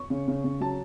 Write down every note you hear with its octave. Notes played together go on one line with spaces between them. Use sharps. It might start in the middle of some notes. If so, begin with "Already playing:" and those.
Already playing: C#6
C#3
C#3
C#3
F#3 A5